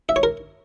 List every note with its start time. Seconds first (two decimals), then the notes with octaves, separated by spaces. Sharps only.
0.09 E5
0.16 C#5
0.23 A#4